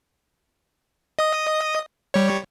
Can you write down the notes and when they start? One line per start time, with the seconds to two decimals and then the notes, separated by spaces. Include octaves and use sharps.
1.19 D#5 D#6
2.14 G3 C#5